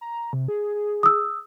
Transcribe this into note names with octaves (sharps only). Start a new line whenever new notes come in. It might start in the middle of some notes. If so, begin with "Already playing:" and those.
A#5
C3
G#4
G#4
D#6 E6